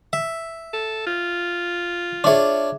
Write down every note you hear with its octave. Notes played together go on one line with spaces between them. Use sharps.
E5
A4
F4
D4 G#4 C#5 E5 D6